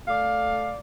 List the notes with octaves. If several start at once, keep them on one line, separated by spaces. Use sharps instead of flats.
A3 D5 F5